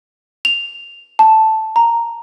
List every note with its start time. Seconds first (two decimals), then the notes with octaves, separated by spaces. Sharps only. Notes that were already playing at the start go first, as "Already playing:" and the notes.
0.45 F7
1.19 A5
1.76 A#5